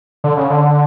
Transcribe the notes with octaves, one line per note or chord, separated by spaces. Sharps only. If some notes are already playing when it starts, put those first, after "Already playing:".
D3
C#3
D3